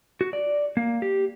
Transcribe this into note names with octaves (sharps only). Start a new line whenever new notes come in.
F#4
D5
A#3
G4